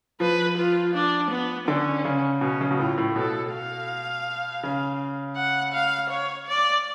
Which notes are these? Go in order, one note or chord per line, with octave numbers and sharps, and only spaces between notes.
F3 B4
F4
D4
B3
D3 C#4
C#3
B2 C#4
C#3
B2
A2 F4
A2
B2 A4
F5
C#3
F#5
F5
C#5
D5